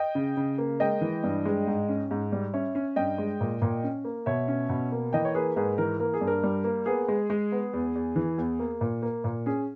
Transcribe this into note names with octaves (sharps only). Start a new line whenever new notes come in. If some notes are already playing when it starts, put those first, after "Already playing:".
Already playing: D#5 G5
C#3
C#3
A#3
G#3 D#5 G5
E3
G2
G#3
G#2
C#4
G#2
G3
C#4 C#5 E5
C#4
G2 D#5 G5
G#3
A#2
A#2
C#4
A#3
B2 C#5 E5
C#4
B2
A#3
E3 D#5 G5
C#5
A#3 G#4 B4
G#2 G#4 B4
E3 A#4
A#3 A#4
G#4
G2
A#4
G3
A#3
B3 G#4
G#3
G#3
B3
E2
E2
E3
E2
A#3
A#2
A#3
A#2
C#4 G#4